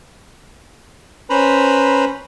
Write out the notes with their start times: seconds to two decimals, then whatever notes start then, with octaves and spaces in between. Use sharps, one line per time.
1.30 C#4 B4 C5 A#5 B5